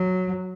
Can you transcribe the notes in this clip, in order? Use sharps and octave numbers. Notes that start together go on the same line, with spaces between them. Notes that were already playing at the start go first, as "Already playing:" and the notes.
Already playing: F#3